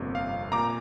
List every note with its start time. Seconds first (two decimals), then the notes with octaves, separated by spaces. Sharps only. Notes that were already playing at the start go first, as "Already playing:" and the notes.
Already playing: G1 F2 C3 A#3
0.15 F5
0.52 A#2 A#3 A#5 D6